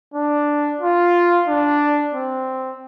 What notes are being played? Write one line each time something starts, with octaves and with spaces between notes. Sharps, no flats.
D4
F4
D4
C4